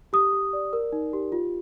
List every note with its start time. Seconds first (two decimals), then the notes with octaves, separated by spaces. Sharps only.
0.13 G4 D#6
0.33 G4
0.53 D5
0.73 A#4
0.92 D#4
1.13 G4
1.32 F4